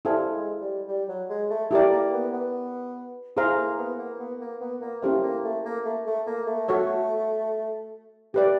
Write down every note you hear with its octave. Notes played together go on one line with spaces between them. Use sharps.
G3 E4 A4 C5 F5 G#5
G#3
G3
G3
F#3
G#3
A3
A3 E4 G4 A#4 D5
A#3
B3
B3
A3 E4 G#4 C5 F5 A#5
A#3
B3
A#3
B3
A#3
B3
A#3
A3 C#4 E4 G4 C5 F5
A#3
A3
A#3
A3
A3
A#3
A3
F#4 A4 C#5 E5
A3 G4 B4 D5